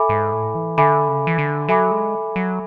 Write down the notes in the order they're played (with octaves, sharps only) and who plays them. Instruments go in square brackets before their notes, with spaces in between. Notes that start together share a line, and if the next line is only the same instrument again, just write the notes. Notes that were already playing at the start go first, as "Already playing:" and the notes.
Already playing: [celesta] A4 E5 G#5 B5 D6
[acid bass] G#2
A2
E3
[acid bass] D3 [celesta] A4 E5 G#5 B5 D6
[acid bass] C#3
E3
D3
[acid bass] F#3 [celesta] A4 E5 G#5 B5 D6
[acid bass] G#3
F#3